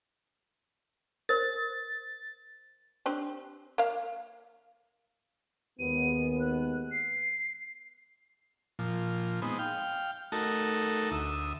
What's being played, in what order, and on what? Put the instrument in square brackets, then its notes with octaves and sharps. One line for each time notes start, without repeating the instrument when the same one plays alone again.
[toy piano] A#4 C5 [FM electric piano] A6
[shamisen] C4 D4 G4
A#3 F5
[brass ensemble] D#2 G#3 B3 [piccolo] D#7
[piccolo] F#6
C7
[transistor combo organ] A#2 F3
G#3 B3 C4 D#4
F5 G5
A3 D#4 F#4 A4 A#4
D2 E5 D#6